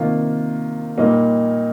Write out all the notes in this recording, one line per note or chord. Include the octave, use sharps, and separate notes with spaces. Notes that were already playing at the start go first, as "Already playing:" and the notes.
Already playing: C3 D#3 A#3 F4
A#2 G3 A#3 D#4